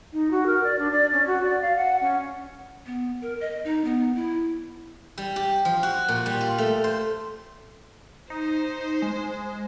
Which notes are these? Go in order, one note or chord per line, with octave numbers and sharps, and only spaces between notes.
D#4
F#4
A#4
D5
D4
D5
C#4
F#4
D5
F5
F#5
C#4
B3
A#4
D#5
D#4
B3
E4
G3
G4
F3
F#4
A#2
G3
F4
A3
C5
D#4 C5
G#3